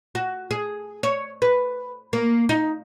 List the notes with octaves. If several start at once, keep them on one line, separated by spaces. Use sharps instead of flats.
F#4
G#4
C#5
B4
A#3
D#4